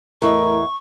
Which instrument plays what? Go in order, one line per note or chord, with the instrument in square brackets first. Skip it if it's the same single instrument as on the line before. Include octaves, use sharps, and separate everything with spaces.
[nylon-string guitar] E2 E4 D#5 [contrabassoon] A2 [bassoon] A#4 [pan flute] C#6